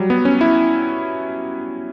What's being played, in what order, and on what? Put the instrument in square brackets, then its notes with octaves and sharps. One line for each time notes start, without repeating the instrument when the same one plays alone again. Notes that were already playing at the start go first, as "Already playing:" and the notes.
Already playing: [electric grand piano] F#3 G3
B3
C#4
E4